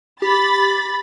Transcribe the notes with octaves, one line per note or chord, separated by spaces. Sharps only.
G4 B5 A6